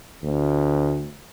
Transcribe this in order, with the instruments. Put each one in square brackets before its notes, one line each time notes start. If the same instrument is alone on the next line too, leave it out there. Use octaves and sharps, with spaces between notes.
[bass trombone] D2